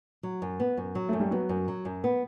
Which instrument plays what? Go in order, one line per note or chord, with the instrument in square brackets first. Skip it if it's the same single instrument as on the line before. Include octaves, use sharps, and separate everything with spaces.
[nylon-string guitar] F#3
F#2
B3
F#2
F#3
[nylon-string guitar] F#2 [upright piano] A3
[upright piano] G3
[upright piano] F#3 [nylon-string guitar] B3
[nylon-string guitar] F#2
F#3
F#2
B3